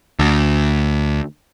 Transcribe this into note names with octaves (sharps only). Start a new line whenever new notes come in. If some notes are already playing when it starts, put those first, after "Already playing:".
D2